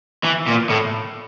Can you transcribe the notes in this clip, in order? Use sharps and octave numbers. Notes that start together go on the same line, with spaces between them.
E3
A#2
A2